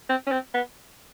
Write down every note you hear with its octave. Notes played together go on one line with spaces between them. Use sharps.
C4
C#4
C4
B3